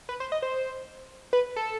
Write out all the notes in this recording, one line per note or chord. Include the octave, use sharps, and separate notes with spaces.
B4
C5
D#5
C5
B4
A4